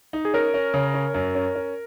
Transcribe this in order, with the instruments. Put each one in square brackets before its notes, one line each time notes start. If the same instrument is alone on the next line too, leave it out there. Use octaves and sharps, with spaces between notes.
[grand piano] D#4
[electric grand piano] G#4
[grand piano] C#4 [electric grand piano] A#4
[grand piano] C#4
C#3
C#4
F#2
C#4
C#4